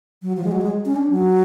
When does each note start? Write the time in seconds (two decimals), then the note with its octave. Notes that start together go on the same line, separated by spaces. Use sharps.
0.22 F#3
0.37 F3
0.44 G#3
0.51 F#3
0.61 G#3
0.85 C#4
0.96 D4
1.10 F#3